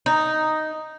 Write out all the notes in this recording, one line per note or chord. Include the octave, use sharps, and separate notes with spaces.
D#4